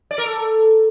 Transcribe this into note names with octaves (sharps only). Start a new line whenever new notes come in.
D5
A#4
A4